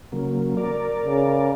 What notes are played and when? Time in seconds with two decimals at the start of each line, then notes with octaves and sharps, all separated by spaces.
0.12 C#3 F#3 A#3
0.57 A#4 D5
1.06 C#3